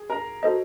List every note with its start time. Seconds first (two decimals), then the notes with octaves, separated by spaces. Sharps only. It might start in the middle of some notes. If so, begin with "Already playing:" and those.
Already playing: G#4
0.10 A#4 A#5
0.43 F#4 A4 C5 D#5